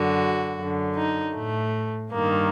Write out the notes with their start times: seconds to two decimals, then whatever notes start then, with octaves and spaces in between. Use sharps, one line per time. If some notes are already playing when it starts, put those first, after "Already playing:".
Already playing: F#2 D3 F#4
0.59 F#2 D3
0.97 D#4
1.36 A2 A3
2.12 G2 D#3 A#3